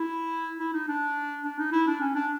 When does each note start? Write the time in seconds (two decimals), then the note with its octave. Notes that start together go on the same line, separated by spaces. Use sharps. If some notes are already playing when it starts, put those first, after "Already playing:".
Already playing: E4
0.59 E4
0.74 D#4
0.88 D4
1.44 D4
1.59 D#4
1.72 E4
1.87 D4
2.01 C#4
2.15 D4